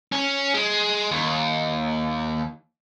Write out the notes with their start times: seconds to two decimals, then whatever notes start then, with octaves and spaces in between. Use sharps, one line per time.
0.12 C#4
0.54 G#3
1.12 D#2